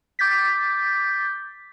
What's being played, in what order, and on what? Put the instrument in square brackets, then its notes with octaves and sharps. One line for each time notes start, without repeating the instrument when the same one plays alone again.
[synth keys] D6 G6 A6 B6